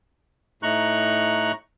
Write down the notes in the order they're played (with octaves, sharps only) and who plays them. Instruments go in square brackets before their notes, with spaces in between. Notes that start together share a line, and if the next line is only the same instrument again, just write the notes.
[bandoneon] A2 A3 D#4 A#5 C#6 F#6